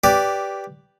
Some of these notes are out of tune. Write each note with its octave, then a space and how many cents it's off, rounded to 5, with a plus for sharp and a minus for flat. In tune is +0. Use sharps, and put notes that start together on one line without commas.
G4 +0 B4 +0 D5 -10